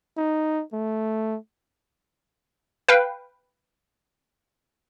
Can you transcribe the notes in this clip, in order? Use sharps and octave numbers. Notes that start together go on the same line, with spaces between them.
D#4
A3
B4 F5 G5